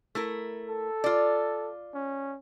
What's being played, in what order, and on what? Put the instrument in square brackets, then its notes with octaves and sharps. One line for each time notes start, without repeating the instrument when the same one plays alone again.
[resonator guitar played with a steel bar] A3 E4 A#4
[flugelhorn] A4
[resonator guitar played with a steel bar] F4 D5
[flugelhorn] C#4